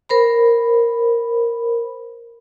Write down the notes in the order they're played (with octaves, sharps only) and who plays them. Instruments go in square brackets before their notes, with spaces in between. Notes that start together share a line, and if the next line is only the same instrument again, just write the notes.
[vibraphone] A#4 C5 B5